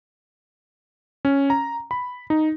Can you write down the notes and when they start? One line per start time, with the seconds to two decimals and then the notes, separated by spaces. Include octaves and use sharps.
1.25 C#4
1.50 A#5
1.91 B5
2.30 D#4